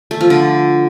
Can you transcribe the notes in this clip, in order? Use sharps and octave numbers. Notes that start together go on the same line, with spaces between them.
A3
F3
D3